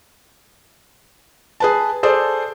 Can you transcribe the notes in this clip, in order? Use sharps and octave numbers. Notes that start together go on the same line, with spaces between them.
G#4 B4 A5
G#4 A4 C5 D5